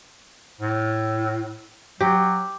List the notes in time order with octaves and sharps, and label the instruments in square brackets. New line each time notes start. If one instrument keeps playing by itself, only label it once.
[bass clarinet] A2
[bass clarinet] F#3 [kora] G4